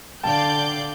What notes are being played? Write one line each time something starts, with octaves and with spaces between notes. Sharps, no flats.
D3 D5 F5 G5 A5 G6